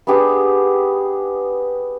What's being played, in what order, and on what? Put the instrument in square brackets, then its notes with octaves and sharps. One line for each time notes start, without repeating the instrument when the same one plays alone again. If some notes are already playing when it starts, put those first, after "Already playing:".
[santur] B3 D4 G4 G#4